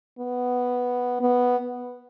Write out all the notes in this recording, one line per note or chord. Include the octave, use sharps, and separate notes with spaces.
B3
B3